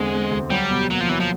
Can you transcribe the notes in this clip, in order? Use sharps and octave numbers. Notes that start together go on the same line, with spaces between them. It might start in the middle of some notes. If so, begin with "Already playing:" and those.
Already playing: E2 D3 G#3 C4
C4
D2
F#3 G3
B2
F#3 A#3
F3
E3 F#3
F3